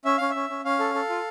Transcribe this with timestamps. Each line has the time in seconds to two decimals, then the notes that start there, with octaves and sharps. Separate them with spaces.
0.05 C#4 E5
0.18 C#4 F5
0.30 E5
0.35 C#4
0.50 C#4
0.65 C#4 F5
0.79 A4
0.94 A4
1.09 F4